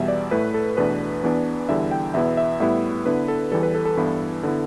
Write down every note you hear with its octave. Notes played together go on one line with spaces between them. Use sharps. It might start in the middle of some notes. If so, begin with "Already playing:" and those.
Already playing: E2 B2 G3 E5
D5
A2 A3 E4 B4
A4
E2 B2 A3 D4 B4
E2 E3 B3 D4
E2 D3 G3 E4 E5
G5
E2 B2 B3 E4 E5
E5
A2 G3 B3 E4 E5
D3 B3 E4 B4
A4
E2 E3 G3 A4
B4
A4
A4
G2 E3 B3 E4
D3 B3 E4